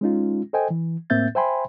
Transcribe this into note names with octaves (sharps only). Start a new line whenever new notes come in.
G#3 C#4 D#4 F4
A4 C5 D#5 G5 G#5
E3
A2 A#3 C4 E5 G6 A6
C5 E5 G5 G#5 B5 C6